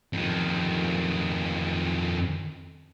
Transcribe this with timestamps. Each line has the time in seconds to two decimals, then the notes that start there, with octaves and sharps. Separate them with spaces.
0.13 F2 D#3